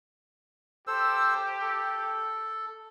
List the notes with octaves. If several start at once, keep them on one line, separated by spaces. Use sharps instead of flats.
G4 A4 C5 E6
A4